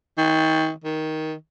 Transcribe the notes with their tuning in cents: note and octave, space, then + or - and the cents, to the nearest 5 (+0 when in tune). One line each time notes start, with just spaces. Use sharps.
D#3 +30
D#3 +10